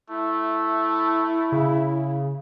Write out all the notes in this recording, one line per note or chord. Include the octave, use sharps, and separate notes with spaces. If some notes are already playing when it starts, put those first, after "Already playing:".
A3 E4
C#3